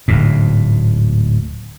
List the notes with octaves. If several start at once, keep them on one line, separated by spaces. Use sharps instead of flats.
D1 D2 G#2